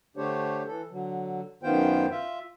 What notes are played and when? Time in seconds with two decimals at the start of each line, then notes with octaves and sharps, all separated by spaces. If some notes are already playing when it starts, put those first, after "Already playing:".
0.17 D3 A3 D4 G4 C5 C#5
0.67 E3 A4
0.91 D3 F#3
1.63 F#2 D#3 B3 F4 C5 G5
2.11 F4 E5